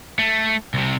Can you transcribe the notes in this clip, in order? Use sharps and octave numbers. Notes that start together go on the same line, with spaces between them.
A3
C2 C3